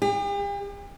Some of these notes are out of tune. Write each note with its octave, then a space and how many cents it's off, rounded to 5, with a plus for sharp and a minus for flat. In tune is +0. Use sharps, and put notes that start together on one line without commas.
G4 +45 G5 +0